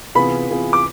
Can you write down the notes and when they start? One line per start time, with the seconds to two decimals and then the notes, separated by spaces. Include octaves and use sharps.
0.15 C3 E3 B3 F4 G#4 B5
0.49 C3 E3 B3 F4 G#4
0.73 D6